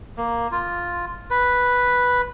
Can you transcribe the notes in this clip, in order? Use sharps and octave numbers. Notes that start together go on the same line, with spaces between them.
A#3
F4
B4